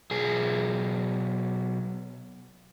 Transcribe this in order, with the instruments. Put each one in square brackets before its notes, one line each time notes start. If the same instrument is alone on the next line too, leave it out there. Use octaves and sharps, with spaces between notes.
[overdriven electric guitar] B1 G#4